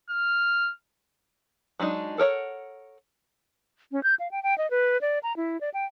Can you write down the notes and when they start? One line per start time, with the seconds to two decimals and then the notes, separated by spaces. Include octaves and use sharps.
0.10 F6
1.79 F#3 G#3 D4 D#4
2.18 A4 A#4 C#5 F#5
3.92 C#4
4.03 G6
4.20 F5
4.31 G5
4.43 G5
4.58 D#5
4.71 B4
5.01 D5
5.23 A#5
5.37 E4
5.61 D5
5.74 G5